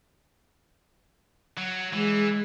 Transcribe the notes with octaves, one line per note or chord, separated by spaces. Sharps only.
F#3
E3 G#3